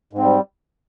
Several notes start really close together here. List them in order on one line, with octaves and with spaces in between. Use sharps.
G#2 C4 G3